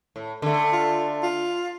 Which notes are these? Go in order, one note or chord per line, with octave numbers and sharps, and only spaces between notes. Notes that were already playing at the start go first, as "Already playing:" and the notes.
A2
D3 A3
F4
F4